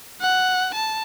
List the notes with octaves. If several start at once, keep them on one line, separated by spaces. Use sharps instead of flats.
F#5
A5